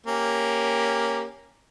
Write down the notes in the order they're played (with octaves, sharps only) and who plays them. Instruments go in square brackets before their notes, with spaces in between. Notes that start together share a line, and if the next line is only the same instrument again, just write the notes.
[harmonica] A#3 C#4 G4